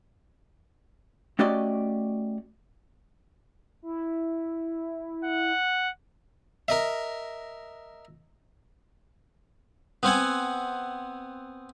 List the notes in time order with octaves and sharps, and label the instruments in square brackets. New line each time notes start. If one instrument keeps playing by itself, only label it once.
[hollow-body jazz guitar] A3 C#4 F#4 G4 D5 D#5
[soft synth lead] E4
[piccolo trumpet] F#5
[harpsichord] A#4 D#5 E5
B3 C4 F#5 G#5